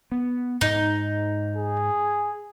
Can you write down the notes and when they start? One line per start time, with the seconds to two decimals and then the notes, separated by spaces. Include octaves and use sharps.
0.12 B3
0.61 G#2 D#4
1.56 G#4